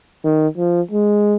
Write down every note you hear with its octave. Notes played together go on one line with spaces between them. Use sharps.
D#3
F3
G#3